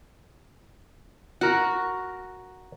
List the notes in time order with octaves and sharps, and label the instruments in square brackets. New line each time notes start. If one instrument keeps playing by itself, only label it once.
[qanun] F#4 [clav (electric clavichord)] A#4 F#5